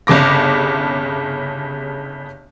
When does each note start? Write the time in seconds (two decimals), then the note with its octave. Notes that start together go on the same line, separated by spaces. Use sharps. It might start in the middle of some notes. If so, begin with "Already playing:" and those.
0.07 G1 C2 C#3 D6 A#6